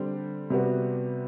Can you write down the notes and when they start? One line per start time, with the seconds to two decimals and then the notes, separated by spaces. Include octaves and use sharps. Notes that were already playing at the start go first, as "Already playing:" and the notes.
Already playing: D3 G3 C4
0.50 C3 G3 B3 F#4